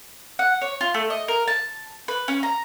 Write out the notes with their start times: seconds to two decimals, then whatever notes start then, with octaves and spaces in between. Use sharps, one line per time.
0.39 F#5
0.61 C#5
0.81 F4
0.94 A3
1.10 D#5
1.28 A#4
1.48 A5
2.08 B4
2.28 C#4
2.43 A#5